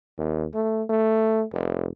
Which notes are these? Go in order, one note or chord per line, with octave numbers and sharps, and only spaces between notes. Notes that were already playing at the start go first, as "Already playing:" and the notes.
D#2
A3
A3
F1